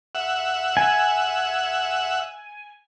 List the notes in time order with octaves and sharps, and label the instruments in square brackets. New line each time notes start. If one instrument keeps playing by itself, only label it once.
[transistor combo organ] E5 F#5
[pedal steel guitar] G#5